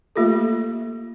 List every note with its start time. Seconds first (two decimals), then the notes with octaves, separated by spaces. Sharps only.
0.16 A3 A#3 F4 G4 A4